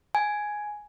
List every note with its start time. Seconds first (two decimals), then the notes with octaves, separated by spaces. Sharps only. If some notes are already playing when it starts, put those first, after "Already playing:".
0.15 G#5